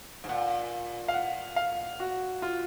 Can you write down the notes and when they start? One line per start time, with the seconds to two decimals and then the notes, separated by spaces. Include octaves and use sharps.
0.24 G#2
0.29 A#2 F#5
1.08 F5
1.14 F#5
1.56 F5
2.00 F#4
2.42 F4